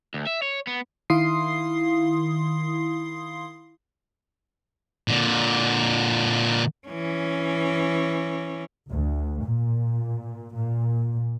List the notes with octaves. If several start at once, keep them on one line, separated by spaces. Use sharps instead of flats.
D2
E5
C#5
B3
D#3 E4 F5 C6 D#6 C7
A#2 D3
E3 C#4
D2
A#2
A#2